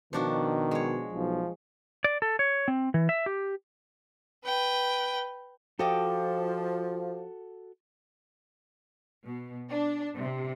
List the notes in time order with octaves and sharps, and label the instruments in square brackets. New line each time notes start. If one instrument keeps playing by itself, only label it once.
[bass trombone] B2 [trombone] D#3 [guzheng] F3 D4 F#4
[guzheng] G#3 C#5
[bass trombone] B1 [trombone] F3
[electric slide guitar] D5
A4
C#5
C4
E3
E5
G4
[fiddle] B4 G5
[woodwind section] F3 [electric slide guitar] F#4 A4 [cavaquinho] G4 D#5 D6
[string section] B2
D4
C3